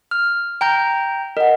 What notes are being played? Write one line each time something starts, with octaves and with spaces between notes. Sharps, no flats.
F6
G5 A#5 G6
A#4 D#5 F#5